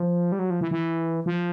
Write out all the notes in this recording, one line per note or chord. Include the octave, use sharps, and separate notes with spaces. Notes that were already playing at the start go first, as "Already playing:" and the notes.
Already playing: F3
G3
F#3
F3
E3
E3
F3